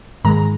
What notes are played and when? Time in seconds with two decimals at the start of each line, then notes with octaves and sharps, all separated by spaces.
0.24 G#2 D#3 G#3 A#5